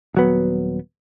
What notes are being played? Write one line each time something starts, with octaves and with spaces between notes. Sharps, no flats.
D#1 F#3 B3